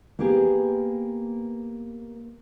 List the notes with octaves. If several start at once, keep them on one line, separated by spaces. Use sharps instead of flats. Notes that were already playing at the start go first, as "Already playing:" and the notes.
A#3 B3 G4 G#4